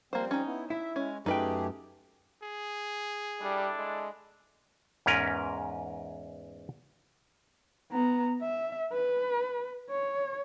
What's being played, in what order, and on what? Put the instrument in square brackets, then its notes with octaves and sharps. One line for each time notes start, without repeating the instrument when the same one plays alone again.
[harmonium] F3 G3 C4 [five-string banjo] A#3 C5
[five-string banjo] C#4 D#4
[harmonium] B3 E4
[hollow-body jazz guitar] E4 [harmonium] E5
[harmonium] G#3 [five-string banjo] C#4
[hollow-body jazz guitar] F#2 G5 [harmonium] A3 G4 G#4 [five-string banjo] D#4 B4
[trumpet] G#4
[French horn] G3 [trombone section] D4 E4 A4
[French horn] G#3
[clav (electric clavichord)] E2 G#2 C#4 A#4 B4
[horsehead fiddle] B3 A#5
E5
B4
C#5